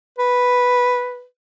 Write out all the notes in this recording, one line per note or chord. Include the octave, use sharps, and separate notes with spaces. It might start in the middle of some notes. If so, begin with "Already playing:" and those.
B4